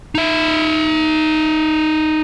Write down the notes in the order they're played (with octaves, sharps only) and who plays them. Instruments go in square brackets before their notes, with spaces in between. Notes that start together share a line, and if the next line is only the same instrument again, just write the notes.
[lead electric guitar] D#4 E5